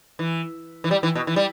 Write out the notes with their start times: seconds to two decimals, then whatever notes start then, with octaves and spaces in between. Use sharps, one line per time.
0.19 E3
0.84 E3
0.91 G3
1.03 E3
1.15 B2
1.27 E3
1.36 G3